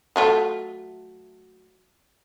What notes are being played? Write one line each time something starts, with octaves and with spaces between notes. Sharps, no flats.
F#3 A3 F4